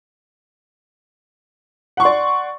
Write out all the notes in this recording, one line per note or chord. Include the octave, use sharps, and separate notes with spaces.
D5 F#5 C6 C#6